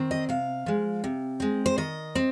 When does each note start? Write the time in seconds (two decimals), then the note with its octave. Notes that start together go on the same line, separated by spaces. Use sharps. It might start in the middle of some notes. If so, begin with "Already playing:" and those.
Already playing: D#3 C4
0.11 D#5
0.29 C3 F5
0.66 F3 G#3
1.04 C3
1.40 G#3 C4
1.66 C5
1.78 D#3 D#5
2.15 C4